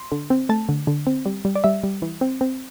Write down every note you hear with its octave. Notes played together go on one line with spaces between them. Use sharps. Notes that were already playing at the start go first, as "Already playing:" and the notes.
Already playing: C6
D3
C4
A3 A5
D3
D3
C4
G3
G3
D5
G3 E5
G3
E3
C4
C4